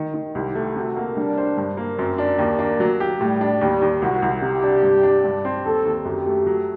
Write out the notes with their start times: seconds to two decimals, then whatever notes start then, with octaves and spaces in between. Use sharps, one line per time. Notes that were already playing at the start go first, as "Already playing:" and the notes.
Already playing: D#3
0.14 D#3
0.35 C2 G4
0.55 A3
0.76 C3 F#4
0.96 A#3
1.16 G3 D4
1.38 C5
1.57 G2
1.77 A#3
1.99 F#2 C4
2.18 D4
2.38 D#2 A#3
2.59 D4
2.80 F#3
3.00 G4
3.21 A2 G3
3.41 D4
3.61 D#2 G3
3.82 D#2
4.02 C2 F#4
4.22 C2
4.42 C3 G4
4.62 D4
4.83 G2
5.03 D4
5.24 G2
5.45 C4
5.65 D#2 A4
5.85 D#2
6.05 F#2 G4
6.26 A3
6.46 F#3